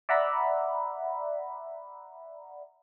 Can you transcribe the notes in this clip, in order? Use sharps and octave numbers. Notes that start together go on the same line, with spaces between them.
D5 E5 F#5 A#5 B5